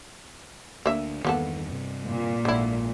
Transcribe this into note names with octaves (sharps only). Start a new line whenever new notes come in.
D2 A#3 D4 E5
E2 G2 D#3 A#3 B3 A4
G2 C3
A#2
A#1 G#2 D3 E4